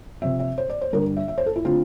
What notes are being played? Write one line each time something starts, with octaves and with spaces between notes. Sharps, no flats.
C3 F3 C4 E5
E5
C5
D5
C5
G2 D3 G3 A#4
E5
E5
C5
A4
E4
D3 A3 C4 F4